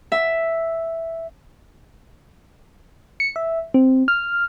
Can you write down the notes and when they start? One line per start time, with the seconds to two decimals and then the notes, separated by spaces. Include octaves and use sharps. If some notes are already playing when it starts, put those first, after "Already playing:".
0.12 E5
3.20 C#7
3.36 E5
3.74 C4
4.08 F6